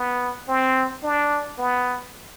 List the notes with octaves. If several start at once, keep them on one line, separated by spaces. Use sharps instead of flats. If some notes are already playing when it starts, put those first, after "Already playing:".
Already playing: B3
C4
D4
B3